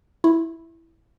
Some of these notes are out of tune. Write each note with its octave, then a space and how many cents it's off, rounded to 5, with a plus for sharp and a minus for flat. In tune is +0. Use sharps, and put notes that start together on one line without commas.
E4 +0 C#6 -45